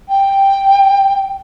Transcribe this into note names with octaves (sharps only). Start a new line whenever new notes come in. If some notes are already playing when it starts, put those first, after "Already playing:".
G5